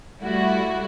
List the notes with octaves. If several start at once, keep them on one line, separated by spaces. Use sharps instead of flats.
G3 A3 E4 F#4